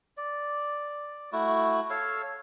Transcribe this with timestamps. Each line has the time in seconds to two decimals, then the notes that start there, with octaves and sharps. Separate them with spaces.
0.17 D5
1.33 A3 E4 F#4
1.90 A4 C#5 F5